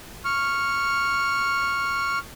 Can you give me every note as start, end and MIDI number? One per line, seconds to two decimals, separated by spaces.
0.25 2.18 85
0.25 2.18 89